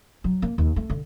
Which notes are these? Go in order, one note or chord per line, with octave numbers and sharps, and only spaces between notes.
F#3
A#3
D#2
A3
D3